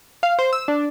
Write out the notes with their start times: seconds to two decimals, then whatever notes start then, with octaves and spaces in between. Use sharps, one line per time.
0.23 F5
0.39 C5
0.53 E6
0.68 D4